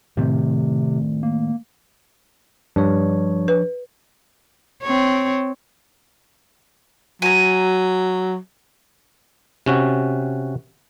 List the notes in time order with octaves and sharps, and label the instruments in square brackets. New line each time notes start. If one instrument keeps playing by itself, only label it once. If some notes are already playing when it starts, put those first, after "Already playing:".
[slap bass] A2 D#3 C4 [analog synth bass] C3
[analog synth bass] A#3
[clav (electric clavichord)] G2 [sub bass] F3 [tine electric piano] D4 C#5
[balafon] B4
[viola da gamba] C4 C#5
[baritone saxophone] F#3 [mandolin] G#5 A#5
[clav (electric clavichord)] C3 C#4 F#4